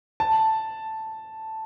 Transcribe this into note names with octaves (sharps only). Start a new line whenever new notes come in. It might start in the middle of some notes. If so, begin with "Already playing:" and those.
A5